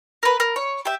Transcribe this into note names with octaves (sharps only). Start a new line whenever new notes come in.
A#4 B4
A#4
C#5
G4 E5